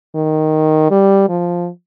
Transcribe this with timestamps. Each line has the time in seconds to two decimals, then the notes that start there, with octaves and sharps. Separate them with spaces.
0.15 D#3
0.91 G3
1.29 F3